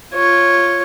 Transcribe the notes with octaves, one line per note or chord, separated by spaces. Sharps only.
F4 C#5